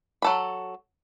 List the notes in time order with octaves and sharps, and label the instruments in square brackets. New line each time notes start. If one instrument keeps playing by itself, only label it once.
[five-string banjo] F#3 A4 B5